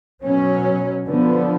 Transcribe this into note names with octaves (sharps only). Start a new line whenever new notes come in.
B2 F#3 C#4
D3 F3 B3